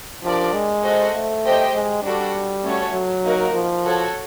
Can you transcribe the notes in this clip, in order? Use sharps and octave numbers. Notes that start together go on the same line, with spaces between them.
F3 D4 G4 A#4 D5
G#3
F#4 A4 C5 D#5
A3
G4 C5 D#5 G5
G#3
G3 D4 F#4 A4
A3 C#4 F#4 A4 C#5
F#3
A#3 D#4 F#4 A#4
F3
F#4 A4 C#5